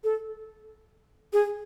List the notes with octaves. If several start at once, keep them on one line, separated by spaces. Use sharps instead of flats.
A4
G#4